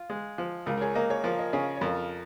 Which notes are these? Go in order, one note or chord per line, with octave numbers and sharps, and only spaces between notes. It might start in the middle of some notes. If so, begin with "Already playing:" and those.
Already playing: F4
G#3
F3
C#2 F4 A#4
A#4
G#4 C#5
A#3 A#4 D#5
G#4 C#5
F3 F4 A#4
A#4 D#5
C#3 G#4 C#5
C#5
F2 F4 A#4